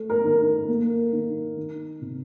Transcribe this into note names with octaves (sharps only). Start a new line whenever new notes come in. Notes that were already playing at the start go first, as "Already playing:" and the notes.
Already playing: A3
A#4
D#3
A#4
A#3
D#3
D#3
C3